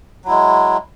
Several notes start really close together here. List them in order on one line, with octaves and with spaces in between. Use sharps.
F#3 E4 G#3